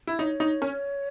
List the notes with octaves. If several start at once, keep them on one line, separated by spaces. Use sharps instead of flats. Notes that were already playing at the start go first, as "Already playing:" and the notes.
E4
D#4 C#5
D#4
C#4